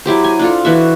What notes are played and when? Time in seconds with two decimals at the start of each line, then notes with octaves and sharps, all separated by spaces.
0.06 F#3 E4 G4 C5
0.24 G#5
0.39 D4 F4 A4
0.65 E3 F#4 E5